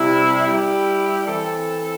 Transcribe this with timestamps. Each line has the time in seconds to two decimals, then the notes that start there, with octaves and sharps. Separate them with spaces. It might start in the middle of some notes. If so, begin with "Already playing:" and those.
Already playing: C3 G3 E4
0.47 G3 E4 G4
1.26 E3 C4 A4